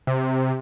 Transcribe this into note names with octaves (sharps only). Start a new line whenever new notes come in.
C3